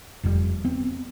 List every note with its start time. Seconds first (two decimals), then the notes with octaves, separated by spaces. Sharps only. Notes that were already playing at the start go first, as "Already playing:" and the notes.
0.23 F1 F2 A2 G3
0.65 B3 C4